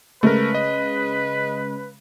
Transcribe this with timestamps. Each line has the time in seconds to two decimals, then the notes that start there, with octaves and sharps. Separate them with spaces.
0.23 C#3 G#3 A3 A#4 B4
0.55 D#5